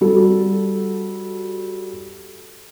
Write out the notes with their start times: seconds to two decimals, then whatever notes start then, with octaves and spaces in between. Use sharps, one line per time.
0.01 G3 F#4 A4